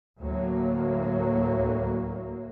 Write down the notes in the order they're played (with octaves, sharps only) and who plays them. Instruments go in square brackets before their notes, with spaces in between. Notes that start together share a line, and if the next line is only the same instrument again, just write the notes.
[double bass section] D2 A2 F#3 A#3